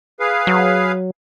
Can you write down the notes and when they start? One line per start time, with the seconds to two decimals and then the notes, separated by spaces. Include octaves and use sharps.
0.20 G#4 B4 F5
0.47 F#3